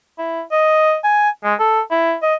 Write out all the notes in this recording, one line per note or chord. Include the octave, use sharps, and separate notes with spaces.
E4
D#5
G#5
G#3
A4
E4
D#5